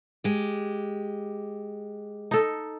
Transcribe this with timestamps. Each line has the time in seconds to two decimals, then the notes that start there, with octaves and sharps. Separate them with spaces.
0.24 G#3 G4
2.31 D#4 A4